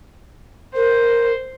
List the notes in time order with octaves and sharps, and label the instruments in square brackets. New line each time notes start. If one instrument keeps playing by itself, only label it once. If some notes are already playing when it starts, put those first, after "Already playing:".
[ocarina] A#4 [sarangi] C5